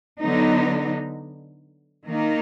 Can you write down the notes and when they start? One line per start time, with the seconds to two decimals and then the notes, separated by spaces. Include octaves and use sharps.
0.21 D3 F#3 B3 D#4
2.08 D#3 A#3 D#4